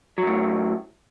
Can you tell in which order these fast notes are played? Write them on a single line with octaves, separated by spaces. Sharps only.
F#3 F#2 A2